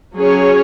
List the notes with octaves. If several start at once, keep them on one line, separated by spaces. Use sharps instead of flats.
F#3 C#4 G#4 C#5